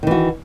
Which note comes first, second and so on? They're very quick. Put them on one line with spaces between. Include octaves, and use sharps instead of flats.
D#3 E3 F#4